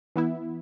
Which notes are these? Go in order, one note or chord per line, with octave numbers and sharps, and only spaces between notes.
E3 B3 E4